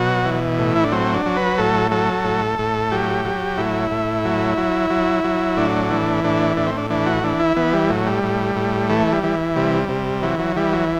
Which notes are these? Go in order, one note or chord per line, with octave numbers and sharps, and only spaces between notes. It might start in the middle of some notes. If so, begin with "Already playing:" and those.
Already playing: B2 F#3 F#4
E3
A2
E4
D4
F#3 C4
D4
F#3
B4
A2 A4
F#3 A4
A2
A2
F#3 G4
F#3
A2 E4
A2
F#3
F#3
F#3
F#3
A2 D4
E3
A2 D4
A2 D4
C4
D4
E3 D4
F#4
E3 D4
E4
E3 B3
G3
A2 F#3
G3
A2
A2
E3 A3
G3
E3
C3 G3
C3
E3 F#3
F#3
E3 G3
F#3